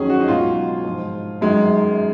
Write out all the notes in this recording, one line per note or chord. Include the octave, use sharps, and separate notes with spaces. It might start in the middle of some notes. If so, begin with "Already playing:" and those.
Already playing: F2 D#3 F#3 C#4 G#4
F#4
D#4
C#2 B2 F#3 F4
G#2 F3
F#2 D#3 F#3 G#3